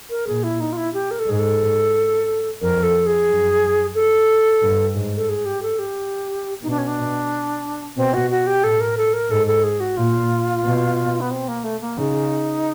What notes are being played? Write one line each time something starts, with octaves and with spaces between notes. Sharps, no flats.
A#4
A#2 G#4
E4
D#4
F4
E4
G4
A#4
A4
G#2 G#4
A4
F2 A#4
A4
G#4
F#2
A4
G2
G#2
A4
G#4
G4
A4
G4
B2 D#4
D4
C#4
D4
B2 C4
F#4
F#4
G4
A2 A4
A#4
A4
A#4
G#2 A4
A4
G#4
F#4
A#2 F4
B2
B3
C4
A#3
A3
A#3
C#3 D#4